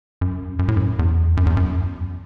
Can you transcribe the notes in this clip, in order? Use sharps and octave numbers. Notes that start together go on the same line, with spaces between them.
F#2
F#2
A2
F#2
E2
F#2
E2
F#2